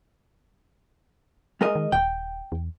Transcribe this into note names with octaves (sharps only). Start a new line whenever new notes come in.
G#3 A#4 D#5
D#3
D#1 G5
E2